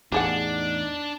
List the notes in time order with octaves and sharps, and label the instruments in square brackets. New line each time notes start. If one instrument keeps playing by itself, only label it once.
[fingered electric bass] E2 A2 [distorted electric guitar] D4 [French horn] D#4 [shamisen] G4 G#4 F#5